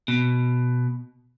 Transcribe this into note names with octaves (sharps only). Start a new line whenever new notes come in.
B2